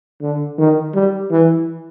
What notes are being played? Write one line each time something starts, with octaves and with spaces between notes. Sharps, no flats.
D3
D#3
G3
E3